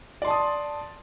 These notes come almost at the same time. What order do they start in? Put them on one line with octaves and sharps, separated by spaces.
D5 C6 A5 D#6